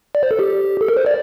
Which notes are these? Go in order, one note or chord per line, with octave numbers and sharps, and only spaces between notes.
D5
C5
A4
G4
A4
A#4
C5
D5